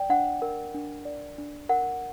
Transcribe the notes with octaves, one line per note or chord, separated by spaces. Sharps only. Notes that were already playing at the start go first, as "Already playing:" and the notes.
Already playing: D5 G5
D4 F#5
A#4
D4
D5
D4
A#4 F#5